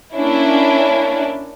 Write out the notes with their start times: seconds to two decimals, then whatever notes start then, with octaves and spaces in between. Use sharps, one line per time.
0.15 A#3 C#4 D4 E4